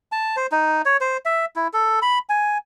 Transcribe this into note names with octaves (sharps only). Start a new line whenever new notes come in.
A5
C5
D#4
C#5
C5
E5
E4
A4
B5
G#5